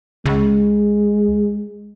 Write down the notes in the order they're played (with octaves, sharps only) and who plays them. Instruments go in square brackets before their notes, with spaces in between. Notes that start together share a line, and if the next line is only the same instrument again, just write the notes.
[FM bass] C#2 [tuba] G#3